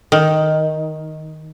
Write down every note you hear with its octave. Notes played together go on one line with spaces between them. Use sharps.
D#3